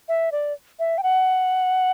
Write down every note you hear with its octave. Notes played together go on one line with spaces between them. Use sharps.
E5
D5
E5
G5
F#5